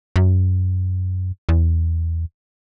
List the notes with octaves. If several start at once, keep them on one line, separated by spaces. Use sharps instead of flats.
F#2
E2